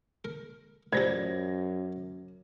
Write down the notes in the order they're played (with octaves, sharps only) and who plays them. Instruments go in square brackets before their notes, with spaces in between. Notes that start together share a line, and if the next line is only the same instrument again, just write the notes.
[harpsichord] A#4
[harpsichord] A1 G4 [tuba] F#2 [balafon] F4 C5 D5 [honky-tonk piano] G#6 A#6